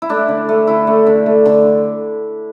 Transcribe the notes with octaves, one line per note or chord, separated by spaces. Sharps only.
E4
A3 D4
D3
A3
D3 E4
A3
D3
A3
D3